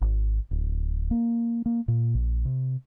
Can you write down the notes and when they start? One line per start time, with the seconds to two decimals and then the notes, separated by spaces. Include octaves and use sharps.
0.01 G#1
0.51 D1
1.11 A#3
1.66 A#3
1.88 A#2
2.15 A#1
2.45 C3